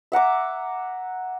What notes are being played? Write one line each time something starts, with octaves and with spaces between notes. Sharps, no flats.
E5 F#5 A#5 D6